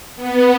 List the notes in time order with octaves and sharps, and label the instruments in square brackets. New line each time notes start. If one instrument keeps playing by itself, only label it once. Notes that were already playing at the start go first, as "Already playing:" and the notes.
[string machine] B3